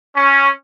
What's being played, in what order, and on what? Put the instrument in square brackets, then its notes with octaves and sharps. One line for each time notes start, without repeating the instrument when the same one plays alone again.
[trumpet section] C#4